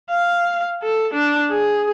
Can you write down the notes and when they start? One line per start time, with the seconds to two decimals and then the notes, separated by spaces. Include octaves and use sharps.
0.10 F5
0.82 A4
1.13 D4
1.50 G#4